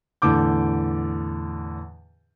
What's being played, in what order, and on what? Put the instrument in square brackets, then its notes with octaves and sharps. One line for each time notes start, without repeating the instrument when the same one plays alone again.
[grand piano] E2 A2 D3 A5 D6 G6